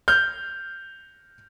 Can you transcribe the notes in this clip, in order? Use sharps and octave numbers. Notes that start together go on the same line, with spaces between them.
F6 G6